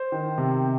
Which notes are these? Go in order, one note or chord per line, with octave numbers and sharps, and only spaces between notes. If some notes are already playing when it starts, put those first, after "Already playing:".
Already playing: C5
D#3
C3